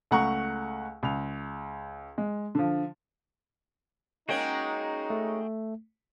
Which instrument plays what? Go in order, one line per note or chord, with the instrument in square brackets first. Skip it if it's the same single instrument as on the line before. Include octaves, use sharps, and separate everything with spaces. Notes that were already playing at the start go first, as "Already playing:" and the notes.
[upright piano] C#2 A3 F#5 A#5 C#6
C#2 F7
G#3
D3 F3
[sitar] G#3 A#3 C#4 [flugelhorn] D#4 [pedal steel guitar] F#4 G#4 G5
[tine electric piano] A3